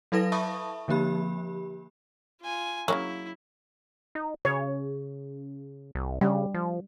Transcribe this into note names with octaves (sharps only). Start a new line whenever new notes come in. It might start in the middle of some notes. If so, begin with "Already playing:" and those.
F#3 E4 A4 B4 F5 A#6
E5 A5 B5 C#6 D#6
D3 F3 A#3 G4 B5
F4 G#5
C#3 F#3 A#3 E4 A#4
D#4
C#3 C#5
C2
C#3 G3
F3